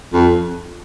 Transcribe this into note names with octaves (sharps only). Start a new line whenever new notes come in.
F2